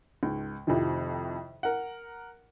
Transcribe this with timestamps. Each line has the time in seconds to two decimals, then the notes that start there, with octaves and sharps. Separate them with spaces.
0.23 C#2 G#2
0.67 F2 A2 C3 D#3 F3
1.63 A#4 F#5